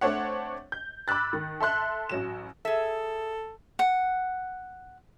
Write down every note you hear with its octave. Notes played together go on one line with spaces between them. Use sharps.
A3 C4 D4 C#5 F#5
G6
B5 D6 E6 F#6 A6
D#3
A4 E5 C6 F#6
A1 F#3 E7
G#4 A4 E5
F#5